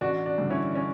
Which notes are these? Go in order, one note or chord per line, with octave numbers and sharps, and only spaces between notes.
A1 D4 F#4
D4
G2 D3
C#4 E4
C#4